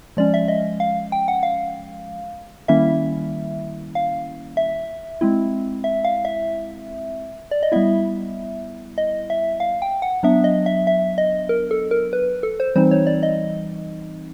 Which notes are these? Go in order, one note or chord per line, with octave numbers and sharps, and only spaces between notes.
F3 G#3 C#4 D5
E5
D#5
F5
G5
F#5
F5
D#3 G3 A#3 C#4 E4 E5
F5
E5
G#3 C4 E4
E5
F5
E5
D5
D#5
G3 B3 E4 E5
D#5
E5
F5
G5
F#5
F#3 B3 D4 E5
D#5
E5
E5
D#5
A#4
A4
A#4
B4
A4
C5
E3 G3 C4 D#4 C5
C#5
D5
D#5